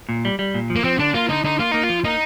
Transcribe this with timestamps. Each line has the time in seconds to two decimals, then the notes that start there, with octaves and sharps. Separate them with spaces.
0.09 A#2
0.25 G3
0.39 G3
0.55 A#2
0.70 F3
0.76 A#3
0.84 F3 C4
0.99 D3 D4
1.14 A#3 F4
1.29 D3 D#4
1.44 D3 D#4
1.60 A#3 F4
1.72 A#3 D#4
1.83 F4
1.90 F3
2.04 A#3 D#4